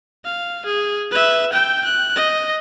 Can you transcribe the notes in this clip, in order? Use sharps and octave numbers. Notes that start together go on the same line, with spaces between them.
F5
G#4
B4 E5
G5 G6
F#6
D#5